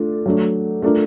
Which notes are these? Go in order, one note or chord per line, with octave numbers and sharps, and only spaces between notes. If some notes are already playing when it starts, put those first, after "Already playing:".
Already playing: A3 D4 F4
F#3 A3 D4
A3 D4 F4 A#4